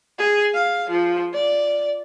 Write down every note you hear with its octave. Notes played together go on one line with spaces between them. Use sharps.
G#4
F5
F3
D5